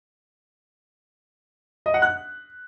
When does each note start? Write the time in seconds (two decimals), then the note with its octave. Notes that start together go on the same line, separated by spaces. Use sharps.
1.86 D#5
1.94 F#5
2.02 F#6